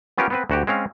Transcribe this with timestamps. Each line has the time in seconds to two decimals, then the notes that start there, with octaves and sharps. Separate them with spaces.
0.18 B3 C#4 F4 G4 A#4
0.30 B3 C4 B4
0.50 D2 F#4 G4
0.67 G#3 C4 C#4 F5